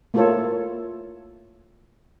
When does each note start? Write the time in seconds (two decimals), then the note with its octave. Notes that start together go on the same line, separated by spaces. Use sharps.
0.14 A3 A#3 E4 F4 A4 C#5